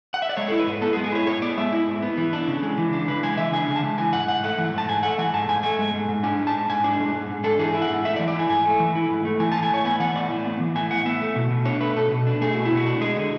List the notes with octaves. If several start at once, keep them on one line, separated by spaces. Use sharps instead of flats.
F#5
E5
D5
G#3 C#5
E4 A4
B4
G#2
B3 A4
G#4
G#3
G#4
E4 C#5
G#2 C#5
B3 D5
G#3 E5
E4
G#2
B3
E3
D4
C#3
G#3
E3
D4
C#3 B4
G#3 G#5
E3 E5
D4 G#5
C#3
A5
G#3
E3 G#5
G#2 F#5
G#2 F#5
A3 F#5
E3
G#2 A5
G#2 G#5
A3 F#5
E3 G#5
G#2 A5
G#2 G#5
A3 G#5
G#3
G#2
G#2
D4 G#5
G#3
A5
G#2
G#2 G#5
D4
G#3
G#2
G#2
D4 A4
E3 G#4
E4
F#5
G#2
A3 E5
D5
E3
D5
E4 G#5
G#2 G#5
A3
E3
E4
G#2
A3
E3 G#5
A5
A2
G#5
A2 C#5
B3 G#5
E3 F#5
A2 D5
A2
B3
E3
A2 G#5
A2 F#5
B3 E5
A3
B2
B2
D4 C#5
A3 B4
B2 A4
B2
D4
A3 G#4
B2 F#4
E4
B2
F#4
D4
G#3 G#4
D3